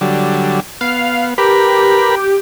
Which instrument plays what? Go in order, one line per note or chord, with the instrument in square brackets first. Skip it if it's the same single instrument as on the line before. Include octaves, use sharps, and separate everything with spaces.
[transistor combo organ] D3 F#3 G3
[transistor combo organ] B3 [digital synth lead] F5
[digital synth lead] G4 [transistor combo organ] A#4 B4 B5